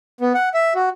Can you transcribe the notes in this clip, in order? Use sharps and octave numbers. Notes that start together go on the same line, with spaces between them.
B3
F#5
E5
F#4